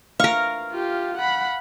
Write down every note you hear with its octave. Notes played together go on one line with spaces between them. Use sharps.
A#4 F5 C#6
F4 G4
F#5 B5